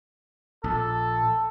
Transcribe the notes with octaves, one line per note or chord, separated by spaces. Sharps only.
A#1 A4